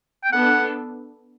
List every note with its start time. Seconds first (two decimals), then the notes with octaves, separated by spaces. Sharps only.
0.24 G5
0.33 B3 D4 A4 F#5